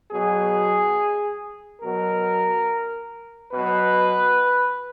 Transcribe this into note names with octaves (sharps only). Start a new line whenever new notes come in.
B2 F#3 G#4
B2 F#3 A#4
B2 F#3 B4